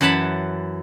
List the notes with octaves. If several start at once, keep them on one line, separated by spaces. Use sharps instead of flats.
F#2 E3 F#5 A5 B5